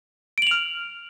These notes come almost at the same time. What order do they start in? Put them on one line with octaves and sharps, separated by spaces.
D7 F#7 F7 F6